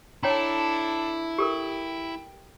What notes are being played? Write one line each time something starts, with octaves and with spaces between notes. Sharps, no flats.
D4 E4 A4 C#5 G5 A#5
G4 A4 A#4 G5